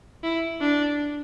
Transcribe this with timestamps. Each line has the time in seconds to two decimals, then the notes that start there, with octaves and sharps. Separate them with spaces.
0.23 E4
0.61 D4